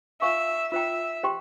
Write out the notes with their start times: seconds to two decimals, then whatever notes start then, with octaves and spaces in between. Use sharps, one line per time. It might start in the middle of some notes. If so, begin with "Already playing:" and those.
0.21 F4 C5 E5 F5 G#5 C#6
0.72 F4 C5 E5 G5 A#5
1.23 G4 C5 G5 C6